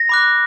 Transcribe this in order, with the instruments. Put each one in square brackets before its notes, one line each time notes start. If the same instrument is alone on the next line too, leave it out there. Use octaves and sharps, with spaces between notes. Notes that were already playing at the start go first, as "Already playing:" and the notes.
Already playing: [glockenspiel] A#6
B5 D6 F#6